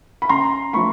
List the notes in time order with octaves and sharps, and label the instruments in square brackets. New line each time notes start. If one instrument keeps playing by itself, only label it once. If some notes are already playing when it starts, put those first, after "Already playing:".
[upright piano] B5
C#3 A#5 C6
F3 A3 B5 C#6